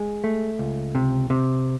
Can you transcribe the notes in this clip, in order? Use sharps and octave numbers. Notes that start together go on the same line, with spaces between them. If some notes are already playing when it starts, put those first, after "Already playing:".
Already playing: G#3
A3
C#2
C3
C3